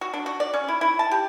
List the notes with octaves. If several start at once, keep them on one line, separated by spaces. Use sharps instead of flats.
F#4
D4
F#4
D5
C#4
E4
E4
A5
G4